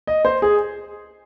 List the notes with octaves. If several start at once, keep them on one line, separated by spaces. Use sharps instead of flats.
D#5
C5
G#4